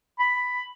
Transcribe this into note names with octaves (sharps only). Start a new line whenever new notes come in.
B5